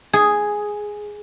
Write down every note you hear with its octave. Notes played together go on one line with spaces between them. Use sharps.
G#4